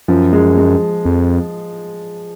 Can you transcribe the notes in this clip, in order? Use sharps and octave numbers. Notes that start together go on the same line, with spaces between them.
F#2 F3
G#3
G#3
F2